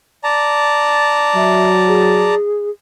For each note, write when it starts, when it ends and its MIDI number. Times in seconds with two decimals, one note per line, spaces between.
0.24 2.35 74
0.24 2.35 81
0.24 2.35 82
1.36 2.36 54
1.36 1.68 76
1.88 2.70 68